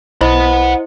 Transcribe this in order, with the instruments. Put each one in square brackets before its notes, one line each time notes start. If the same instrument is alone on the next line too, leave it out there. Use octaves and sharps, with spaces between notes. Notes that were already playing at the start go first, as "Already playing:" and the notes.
[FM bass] B1 [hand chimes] E4 C5 D#5 [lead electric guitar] F#5 B5